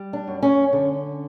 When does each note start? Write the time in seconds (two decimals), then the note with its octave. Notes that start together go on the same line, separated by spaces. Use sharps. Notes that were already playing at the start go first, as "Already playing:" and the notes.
Already playing: G3
0.13 D4
0.27 F#2
0.43 C#4
0.73 D3